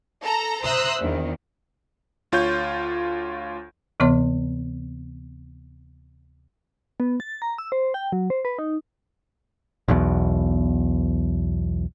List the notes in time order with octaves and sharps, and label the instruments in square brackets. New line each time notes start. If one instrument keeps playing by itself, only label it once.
[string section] A4 A#5
C5 E5 A#5 D#6 E6 F#6
A#1 E2 D#3
[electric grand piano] D2 F4 C#5 G6
[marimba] D2 C3 E3 B3 C#5 C6
[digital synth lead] B3
A6
A#5
E6
C5
G5
F#3
C5
B4
D#4
[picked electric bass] B1 E2 B2